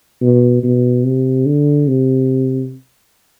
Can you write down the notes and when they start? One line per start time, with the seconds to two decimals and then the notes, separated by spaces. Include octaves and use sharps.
0.21 B2
0.63 B2
1.05 C3
1.46 D3
1.87 C3